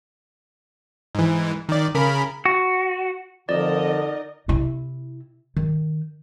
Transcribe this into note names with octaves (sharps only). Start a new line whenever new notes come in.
G#2 E3
D#3 D5
C#3 A#4 B5
F#4
F2 D3 D#4 A#4 D5 D#5
C3 E4
D#3